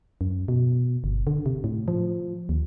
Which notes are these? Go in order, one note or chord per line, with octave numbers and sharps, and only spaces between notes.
F#2
B2
G1
D3
C3
A2
F3
D#2